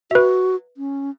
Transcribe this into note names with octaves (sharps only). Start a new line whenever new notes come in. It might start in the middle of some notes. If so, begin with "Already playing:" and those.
F#4 B4 E5
C#4